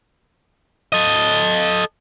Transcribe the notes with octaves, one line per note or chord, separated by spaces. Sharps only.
A4 D#5